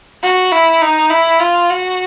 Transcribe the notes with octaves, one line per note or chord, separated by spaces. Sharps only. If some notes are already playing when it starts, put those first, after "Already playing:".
F#4
E4
D#4
E4
F4
F#4